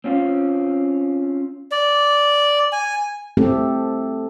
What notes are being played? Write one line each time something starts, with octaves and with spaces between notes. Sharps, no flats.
C4 C#4 F4
D5
G#5
A3 C4 G4 A4